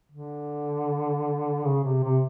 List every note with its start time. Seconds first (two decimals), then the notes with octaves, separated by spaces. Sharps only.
0.12 D3
1.64 C#3
1.83 C3
2.03 C3